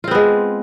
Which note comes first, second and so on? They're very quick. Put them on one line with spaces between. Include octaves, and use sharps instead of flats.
F4 C4 B3 G#3